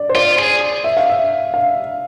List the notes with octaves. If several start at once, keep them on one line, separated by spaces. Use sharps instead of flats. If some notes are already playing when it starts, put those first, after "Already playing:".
Already playing: D5
C5
F4 D5
G#4
E5
F5
E5
F5